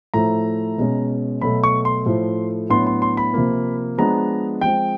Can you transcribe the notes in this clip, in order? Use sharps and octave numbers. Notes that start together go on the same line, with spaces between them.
A2 F3 A3 A#5
B2 G#3 C#4
B2 F#3 A3 B5
C#6
C6
A2 F3 A3
A2 F#3 B3 D4 C6
C6
C6
B5
C3 F3 A#3
F3 G#3 B3 D4 A#5
F3 G#3 C4 G5